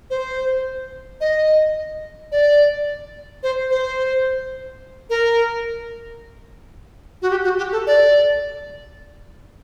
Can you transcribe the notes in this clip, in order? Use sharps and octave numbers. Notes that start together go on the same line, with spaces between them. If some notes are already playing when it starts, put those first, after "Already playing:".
C5
D#5
D5
C5
C5
A#4
F#4
G4
F#4
G4
A4
D5